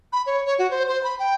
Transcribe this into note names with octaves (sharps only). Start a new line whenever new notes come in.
B5
C#5
C#5
F#4
C5
C5
B5
G5